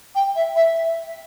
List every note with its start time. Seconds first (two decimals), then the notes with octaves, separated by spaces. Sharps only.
0.14 G5
0.35 E5
0.55 E5